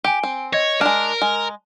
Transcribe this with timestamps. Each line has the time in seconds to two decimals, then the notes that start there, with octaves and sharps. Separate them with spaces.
0.04 G4 G#5 D7 G7
0.23 C4
0.53 C#5 D#5 G#6 A#6
0.81 G#3 D4 A#4 F6
1.22 G#3